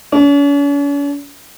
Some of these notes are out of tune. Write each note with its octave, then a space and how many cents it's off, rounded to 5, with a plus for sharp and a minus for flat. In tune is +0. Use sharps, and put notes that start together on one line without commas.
C#4 +45